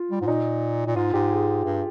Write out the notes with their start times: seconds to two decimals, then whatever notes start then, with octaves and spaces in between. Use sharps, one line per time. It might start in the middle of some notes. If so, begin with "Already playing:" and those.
Already playing: F4
0.11 G3
0.21 G#2
0.27 A#2 D#4
0.86 A#2
0.96 G#2 F4
1.14 G#2 G4
1.31 G#4
1.65 G2